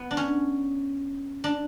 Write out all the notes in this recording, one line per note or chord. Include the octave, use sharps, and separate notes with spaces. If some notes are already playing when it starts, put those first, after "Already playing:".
Already playing: B3
D4
C#4
D4